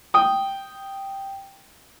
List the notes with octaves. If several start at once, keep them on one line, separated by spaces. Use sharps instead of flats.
G5 D#6